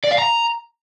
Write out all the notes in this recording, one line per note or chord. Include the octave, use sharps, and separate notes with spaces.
D5
F5
A#5